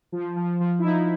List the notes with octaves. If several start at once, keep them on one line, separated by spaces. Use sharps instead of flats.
F3
F3
F3
E4
F3 D#4